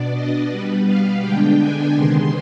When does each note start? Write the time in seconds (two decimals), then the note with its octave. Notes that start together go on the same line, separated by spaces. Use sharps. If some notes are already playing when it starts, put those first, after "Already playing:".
Already playing: B2 B3 D4 D5
0.14 D#5
0.50 B2 G3 B3 B4
0.87 F5
1.22 D3 G#3 B3 D4 G5
1.59 G#5
1.95 C3 D#3 G#3 B3 C6